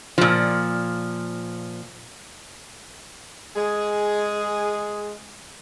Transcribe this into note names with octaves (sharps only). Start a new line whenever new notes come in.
A#2 F3
G#3 G#4